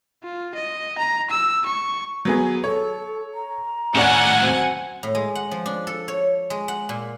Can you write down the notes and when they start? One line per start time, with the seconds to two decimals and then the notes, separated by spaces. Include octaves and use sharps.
0.23 F4
0.55 D#5
0.98 A#5
1.30 E6
1.66 C#6
2.25 F#3 B3 G#4
2.64 A4 C#5
3.34 A#5
3.95 D#2 A2 C#4 C#5 D5 F#5 G#5
4.40 F#3 C4
5.03 A2
5.15 G#3
5.35 F#5
5.51 F3
5.66 D4
5.87 A4
6.08 C#5
6.50 G#3
6.68 F#5
6.89 A#2